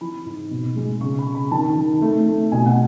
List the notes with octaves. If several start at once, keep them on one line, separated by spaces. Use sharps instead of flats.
E3 B5
G#2
B2
G#3
C#3 C#6
B5
C#3
B5
D#3 A5
D#3
A3
A3
B2 G#5
F#5